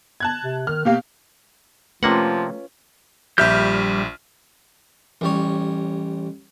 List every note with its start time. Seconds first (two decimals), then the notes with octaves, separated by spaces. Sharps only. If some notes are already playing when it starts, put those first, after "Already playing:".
0.20 A5 F#6 G#6
0.44 C3
0.67 D#3 F6
0.85 B2 A#3 G4 F5
2.03 C3 F3 A3 A#3 C#4 F4 B4 F#5
3.38 A#1 G3 G4 E5 F6 G6
5.21 A1 G3 C#5